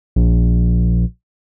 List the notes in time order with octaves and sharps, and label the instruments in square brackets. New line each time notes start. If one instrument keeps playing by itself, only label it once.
[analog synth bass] A#1